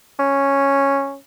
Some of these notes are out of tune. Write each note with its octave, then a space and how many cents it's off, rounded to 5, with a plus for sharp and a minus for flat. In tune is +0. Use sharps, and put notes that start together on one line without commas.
C#4 -5